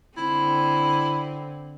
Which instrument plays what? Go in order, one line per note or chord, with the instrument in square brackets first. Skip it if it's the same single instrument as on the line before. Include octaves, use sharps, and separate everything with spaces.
[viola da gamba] D3 C4 [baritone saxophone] E4